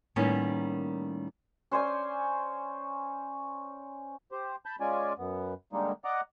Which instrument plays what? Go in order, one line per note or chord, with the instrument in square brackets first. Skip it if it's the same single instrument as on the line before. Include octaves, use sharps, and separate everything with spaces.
[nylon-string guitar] A2 D#3 G3 A#3 B3 C#4
[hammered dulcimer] C#4 C5 D5 G#5
[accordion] G4 C5
A5 B5 G6
G#3 C#4 F4 D5 G#5
F#2 B3
D3 G3 G#3 A#3 D#4
D5 D#5 F#5 A#5 D6